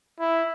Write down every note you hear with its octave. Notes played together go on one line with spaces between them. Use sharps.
E4